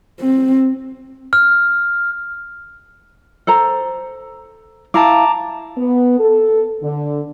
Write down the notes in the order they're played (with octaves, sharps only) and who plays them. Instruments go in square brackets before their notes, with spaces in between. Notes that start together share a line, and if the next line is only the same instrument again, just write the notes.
[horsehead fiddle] C4
[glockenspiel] F6
[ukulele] A4 C5 A#5
[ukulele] E4 F5 [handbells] A5 A#5 D6
[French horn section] B3
A4
D3